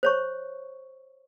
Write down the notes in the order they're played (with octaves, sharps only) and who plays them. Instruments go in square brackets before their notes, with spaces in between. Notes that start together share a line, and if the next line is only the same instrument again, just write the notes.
[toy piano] C5 C#5 C#6